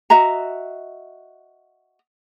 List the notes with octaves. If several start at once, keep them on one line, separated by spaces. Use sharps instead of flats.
F#4 D#5 E5 A#5